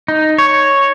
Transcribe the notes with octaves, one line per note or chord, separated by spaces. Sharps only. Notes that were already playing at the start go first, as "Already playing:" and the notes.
D#4
C#5